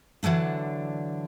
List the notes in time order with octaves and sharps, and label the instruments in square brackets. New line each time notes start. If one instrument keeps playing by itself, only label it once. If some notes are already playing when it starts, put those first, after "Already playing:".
[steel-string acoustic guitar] D3 E3 F#3 A3 D4